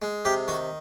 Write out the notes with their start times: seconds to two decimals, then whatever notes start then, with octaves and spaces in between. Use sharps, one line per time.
0.02 G#3
0.25 C3 G4
0.48 D#3 F#4